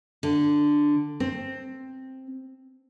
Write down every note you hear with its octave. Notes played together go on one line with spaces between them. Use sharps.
D3
C4